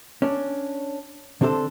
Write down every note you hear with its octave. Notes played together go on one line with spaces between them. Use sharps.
C#4 D4
D3 C4 D4 G4 A4 C5